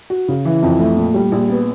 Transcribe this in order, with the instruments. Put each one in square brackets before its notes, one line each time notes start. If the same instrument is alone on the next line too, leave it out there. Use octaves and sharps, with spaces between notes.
[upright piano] F#4
C#3
E3
F2
A3
A#2
G3
A#1
B3